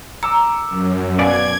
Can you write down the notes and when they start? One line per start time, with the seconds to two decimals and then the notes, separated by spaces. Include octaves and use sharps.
0.23 A#5 D6 E6 C#7
0.69 F#2
1.19 B2 B4 D5 F5 G#5 G#6